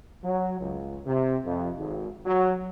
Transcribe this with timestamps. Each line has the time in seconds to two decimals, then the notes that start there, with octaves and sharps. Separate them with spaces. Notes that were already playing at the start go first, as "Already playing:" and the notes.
0.24 F#3
0.60 C#2
1.06 C3
1.45 F2
1.77 G#1
2.26 F#3